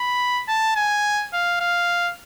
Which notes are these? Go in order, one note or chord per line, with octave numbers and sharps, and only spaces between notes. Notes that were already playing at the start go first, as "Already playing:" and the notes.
Already playing: B5
A5
G#5
F5
F5